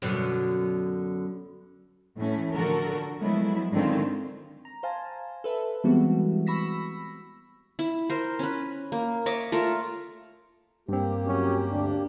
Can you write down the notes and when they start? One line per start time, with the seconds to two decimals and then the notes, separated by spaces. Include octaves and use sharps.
0.02 F#2 B2 D3
2.16 A2 E3 A3 C#4
2.53 D3 F3 F#4 A4 A#4
3.22 F3 F#3 G#3 A3 B3 E4
3.72 G#2 D3 D#3 C4 C#4 F4
4.65 A#5
4.83 C5 F5 G#5 A5
5.44 A4 B4 E5
5.84 E3 G3 G#3 B3 C4 F#4
6.47 B5 C#6 E6 A#6 B6
7.79 E4
8.10 A#4 C5
8.39 C#4 B4
8.92 A#3
9.26 C#5 D#5 E5 D6
9.52 A3 F4 A#4
10.89 G2 A#3 C4 G4
11.26 F#3 C#4
11.72 D2 D4